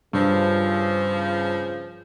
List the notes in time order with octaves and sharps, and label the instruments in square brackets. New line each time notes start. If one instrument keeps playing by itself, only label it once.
[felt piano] G2 [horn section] C#3 F3